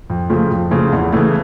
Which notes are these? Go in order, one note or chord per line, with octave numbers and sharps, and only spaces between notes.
F2
C#3 F3 A3
F2
C#3 F3 A3
E2
C#3 E3 A3